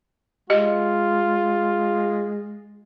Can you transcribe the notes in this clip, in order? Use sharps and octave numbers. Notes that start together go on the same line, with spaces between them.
G#3 F4 G4 D#5